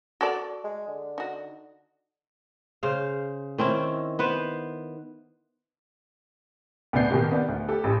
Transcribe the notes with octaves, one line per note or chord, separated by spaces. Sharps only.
F#4 A4 D5
G#3
D3
D#4 F#4
C#3 C5 F5
D#3 C4 C#4 E4
B3 B4 C5
D2 B2 B3 D5 G6 C7
B2 D#3 A#3 G4 A#4
B3 D5
D2
G4 A4
A1 G4